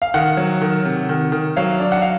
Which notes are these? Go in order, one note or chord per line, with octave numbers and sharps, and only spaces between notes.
F5
D#3 F#5
F#3
D#3
C3
D#3
D#3
F#3 F5
D4
F#5
F5